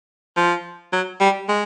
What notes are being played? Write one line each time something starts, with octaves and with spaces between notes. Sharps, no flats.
F3
F#3
G3
G#3